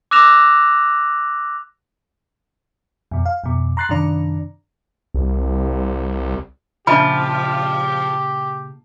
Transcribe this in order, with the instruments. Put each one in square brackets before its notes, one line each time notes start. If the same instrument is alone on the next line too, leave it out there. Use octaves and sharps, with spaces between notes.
[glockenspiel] D6 E6 F#6 A#6 E7 F7
[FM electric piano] F2 B2
F5
F2 B2
A#5 C6 F#6 A6 C7
F#2 C3 D#3 D4 D5 A#5
[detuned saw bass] C2
[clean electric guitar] A#2 C#3 [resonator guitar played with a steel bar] F3 [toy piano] D4 E5 B5 [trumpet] G4